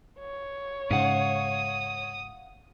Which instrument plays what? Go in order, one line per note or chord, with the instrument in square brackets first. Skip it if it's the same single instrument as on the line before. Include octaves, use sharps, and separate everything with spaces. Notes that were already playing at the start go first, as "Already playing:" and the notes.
[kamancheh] C#5
[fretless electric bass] G#2 C#3 [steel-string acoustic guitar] F5 F#5 [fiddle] D#6